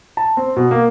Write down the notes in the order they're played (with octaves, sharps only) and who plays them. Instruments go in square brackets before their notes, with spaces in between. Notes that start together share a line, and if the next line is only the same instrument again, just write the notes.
[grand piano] A5
C4
B2
A#3